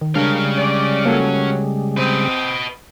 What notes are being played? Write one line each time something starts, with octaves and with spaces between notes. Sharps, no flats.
D#3
C#3 G3 G#3 C#4 D4 A#4 C#5 F5
D5
F#3 A#3 A4
C4 B4 D#5